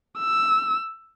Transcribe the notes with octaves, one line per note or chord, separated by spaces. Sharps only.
E6